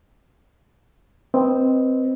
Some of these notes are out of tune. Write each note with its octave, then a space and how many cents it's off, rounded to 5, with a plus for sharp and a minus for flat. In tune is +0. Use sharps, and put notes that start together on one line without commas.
C4 +0 B4 -15 D#5 +0